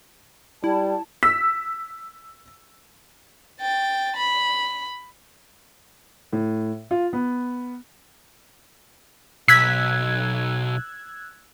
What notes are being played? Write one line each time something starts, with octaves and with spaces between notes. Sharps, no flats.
G3 E4 A5
E6 B6
G5 A6
B5
A2
F4
B3
B1 E6 F#6 G#6 B6